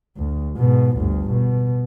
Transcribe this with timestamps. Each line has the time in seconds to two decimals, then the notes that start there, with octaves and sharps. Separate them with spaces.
0.18 D2
0.57 G#2 B2
0.97 G1 D2
1.31 B2